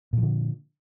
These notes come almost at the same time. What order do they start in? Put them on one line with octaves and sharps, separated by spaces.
A#2 F3 D3